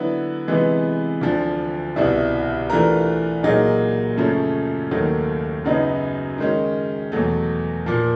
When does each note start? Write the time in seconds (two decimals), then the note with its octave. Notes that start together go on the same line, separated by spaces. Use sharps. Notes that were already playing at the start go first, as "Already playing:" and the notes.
Already playing: D3 F#3 B3 E4
0.48 C3 E3 G#3 B3
1.21 D2 D3 F3
1.96 C2 B2 G3 B3 E4
2.70 E3 A3 D4 F4 A#4
3.43 A#2 F#3 A#3 D#4 G#4
4.17 F#2 C#3 F3 A3 C#4
4.91 D#2 D#3 F#3 A3
5.65 F#2 C#3 F#3 B3 D#4
6.38 D#3 G#3 C#4
7.12 E2 B2 F#3 A3
7.86 A#2 F3 A#3